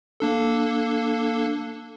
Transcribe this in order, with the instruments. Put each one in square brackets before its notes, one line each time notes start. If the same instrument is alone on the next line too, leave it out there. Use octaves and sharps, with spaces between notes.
[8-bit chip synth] A#3 D4 A4